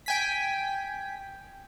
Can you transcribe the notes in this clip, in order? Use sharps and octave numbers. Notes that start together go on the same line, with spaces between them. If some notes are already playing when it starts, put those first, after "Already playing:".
G5 G#5 B6